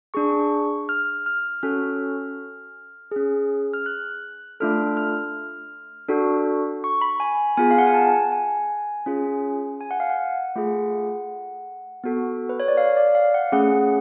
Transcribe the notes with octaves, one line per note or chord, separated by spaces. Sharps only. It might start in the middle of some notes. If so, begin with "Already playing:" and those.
D4 G#4 C#6
F6
F6
C#4 F#4 A4 F6
C#4 G#4
F6
F#6
A3 D4 F4 A4 F6
F6
D4 F#4 A4
C#6
B5
G#5
B3 F4 G#4 G#5
F5
F#5
G#5
A5
G#5
C#4 F4 G#4
G#5
F#5
F5
F#5
A3 F4 G#4
B3 F#4 A4
B4
C#5
D5
F5
D5
F5
F#5
A3 C#4 G#4 F#5